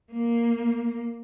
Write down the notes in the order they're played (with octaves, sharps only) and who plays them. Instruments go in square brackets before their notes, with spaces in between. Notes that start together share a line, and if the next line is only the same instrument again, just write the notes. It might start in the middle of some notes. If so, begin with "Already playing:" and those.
[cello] A#3